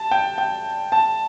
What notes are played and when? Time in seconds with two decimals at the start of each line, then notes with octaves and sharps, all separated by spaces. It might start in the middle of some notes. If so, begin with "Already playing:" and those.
Already playing: A5
0.11 G5
0.38 G5
0.92 A5